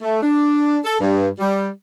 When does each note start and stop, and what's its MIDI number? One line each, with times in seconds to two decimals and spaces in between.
0.02 0.21 57
0.22 0.78 62
0.85 0.95 69
1.00 1.27 43
1.39 1.69 55